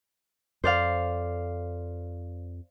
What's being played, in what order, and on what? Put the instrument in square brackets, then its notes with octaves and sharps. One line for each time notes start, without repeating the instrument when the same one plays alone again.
[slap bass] F2 [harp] C5 D5 F5